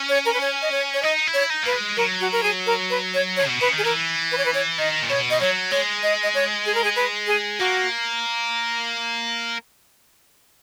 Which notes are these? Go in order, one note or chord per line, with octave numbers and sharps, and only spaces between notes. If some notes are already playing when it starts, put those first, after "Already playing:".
Already playing: C#4
C#5
A#4
B4
C#5
D#5
C#5
C#5
D#4 D#5
E4
C#5
D#4
A#3 B4
G#3
F#3 A#4
F#4
A#4
G#4
A#4
B4
C#5
C#5
B2
C#3 B4
D#3
G#4
E3 A#4
B4
C#5
B4
C#5
D#3 D#5
A#2
B2 C#5
D#5
F#3 C#5
G#3 C#5
D#5
D#5
C#5
G#4
A#4
G#4
B4
G#4
A#3 F#4